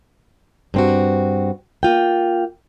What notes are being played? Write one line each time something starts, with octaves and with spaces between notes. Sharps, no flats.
G2 C4 F#4
A#3 F4 G5